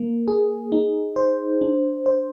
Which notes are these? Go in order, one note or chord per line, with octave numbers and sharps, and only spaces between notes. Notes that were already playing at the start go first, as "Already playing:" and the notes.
Already playing: A#3
G#4
D#4
C5
D4
C5